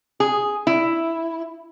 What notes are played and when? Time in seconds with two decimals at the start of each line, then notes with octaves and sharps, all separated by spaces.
0.20 G#4
0.67 E4